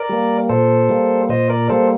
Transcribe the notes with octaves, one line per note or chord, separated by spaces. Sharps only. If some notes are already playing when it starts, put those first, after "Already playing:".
Already playing: A#4 D5
G3 A#3
A#2 A4 C5
G3 A#3
A#2 C5 D#5
A#4 D5
G3 A#3 A4 C5